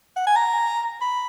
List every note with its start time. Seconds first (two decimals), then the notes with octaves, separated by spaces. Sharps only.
0.16 F#5
0.27 G#5
0.36 A#5
1.02 B5